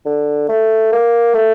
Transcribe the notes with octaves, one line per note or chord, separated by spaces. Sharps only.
D3
A3
A#3
A3